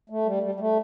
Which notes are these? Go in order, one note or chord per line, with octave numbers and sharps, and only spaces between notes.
A3
G3
G3
G3
A3